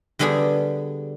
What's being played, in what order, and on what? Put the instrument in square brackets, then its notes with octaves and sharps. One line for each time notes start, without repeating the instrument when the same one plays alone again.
[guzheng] D3 G3 B3 D4 G#4